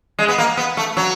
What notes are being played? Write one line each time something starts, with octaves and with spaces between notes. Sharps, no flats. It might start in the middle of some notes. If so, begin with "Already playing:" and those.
G#3
B3
A#3
B3
A3
F#3